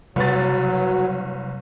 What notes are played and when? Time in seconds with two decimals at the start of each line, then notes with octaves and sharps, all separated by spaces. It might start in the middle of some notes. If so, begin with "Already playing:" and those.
0.16 F#1 C3 F#3 G3 B4 A6